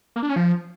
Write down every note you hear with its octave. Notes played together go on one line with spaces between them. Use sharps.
A#3
D4
C#4
F3